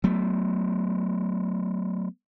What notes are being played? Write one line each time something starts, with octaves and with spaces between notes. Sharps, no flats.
F#3 A3 B3